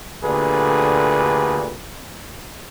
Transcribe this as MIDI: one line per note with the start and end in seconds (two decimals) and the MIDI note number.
0.24 1.76 38
0.24 1.76 46
0.24 1.76 50
0.24 1.76 67
0.24 1.76 68
0.24 1.76 71